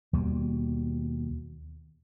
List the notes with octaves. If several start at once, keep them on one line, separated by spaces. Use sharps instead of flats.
D#2 B2 G3